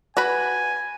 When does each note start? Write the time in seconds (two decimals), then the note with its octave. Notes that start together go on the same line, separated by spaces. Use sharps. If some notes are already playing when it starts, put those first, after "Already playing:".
0.17 F#4 B4 G#5 B5